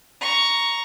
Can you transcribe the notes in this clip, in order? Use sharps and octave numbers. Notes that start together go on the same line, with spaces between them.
A#5 C#6